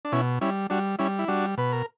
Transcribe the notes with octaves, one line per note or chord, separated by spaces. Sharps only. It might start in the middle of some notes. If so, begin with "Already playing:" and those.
D4
B2 C#4 E4
G3 C#4 E4
G3 D4 F#4
G3 C#4 E4
E4
G3 D4 F#4
B2 B4
A#4